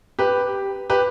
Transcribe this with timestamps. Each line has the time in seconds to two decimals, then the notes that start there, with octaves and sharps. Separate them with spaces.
0.19 G4 B4
0.90 G4 B4